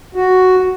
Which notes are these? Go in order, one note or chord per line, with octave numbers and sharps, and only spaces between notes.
F#4